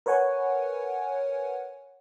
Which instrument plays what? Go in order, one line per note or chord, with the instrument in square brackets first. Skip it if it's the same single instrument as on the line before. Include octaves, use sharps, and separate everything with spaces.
[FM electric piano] A#4 B4 C#5 F#5 G#5